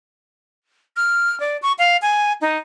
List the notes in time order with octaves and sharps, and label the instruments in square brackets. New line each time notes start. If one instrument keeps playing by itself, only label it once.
[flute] F6
D5
C#6
F5
G#5
D#4